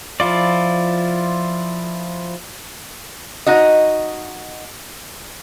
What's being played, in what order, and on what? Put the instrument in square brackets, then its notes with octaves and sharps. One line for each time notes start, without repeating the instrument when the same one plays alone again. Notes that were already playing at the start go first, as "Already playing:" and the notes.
[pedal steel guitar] F3 E4 F4 D5
[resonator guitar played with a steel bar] D#4 F#4 D#5